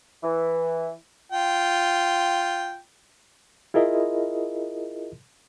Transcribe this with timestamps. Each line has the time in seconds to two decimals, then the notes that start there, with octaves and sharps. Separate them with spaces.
0.24 E3
1.32 F4 G5
3.74 E4 F4 G#4 A#4 D#5 E5